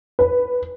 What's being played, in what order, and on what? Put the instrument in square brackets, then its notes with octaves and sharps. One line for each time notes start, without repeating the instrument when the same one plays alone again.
[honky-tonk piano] B4